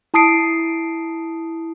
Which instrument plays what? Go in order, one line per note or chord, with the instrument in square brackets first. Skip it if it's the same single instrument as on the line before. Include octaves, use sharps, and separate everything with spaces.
[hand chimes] E4 A5 D#6 C7 D7